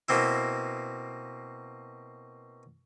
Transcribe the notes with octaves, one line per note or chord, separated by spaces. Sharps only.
B2 A#3 C4 E4